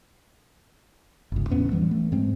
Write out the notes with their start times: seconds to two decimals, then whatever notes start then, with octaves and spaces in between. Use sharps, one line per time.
1.32 G1 C#2
1.50 E2 A2 B3 C#4
1.72 E3 G3
1.91 A3
2.12 G#2 G#3 C4